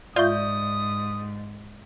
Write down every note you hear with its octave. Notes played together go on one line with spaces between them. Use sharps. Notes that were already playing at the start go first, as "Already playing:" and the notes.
G#2 F4 D5 E5 C#6 D#6 G6